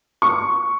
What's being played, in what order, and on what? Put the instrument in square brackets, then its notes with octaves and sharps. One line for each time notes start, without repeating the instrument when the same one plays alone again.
[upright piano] C#6